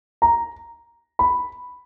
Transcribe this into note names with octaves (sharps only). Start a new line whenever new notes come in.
A#5
B5